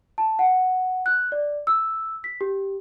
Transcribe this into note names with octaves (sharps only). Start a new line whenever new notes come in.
A5
F#5
F#6
D5
E6
B6
G4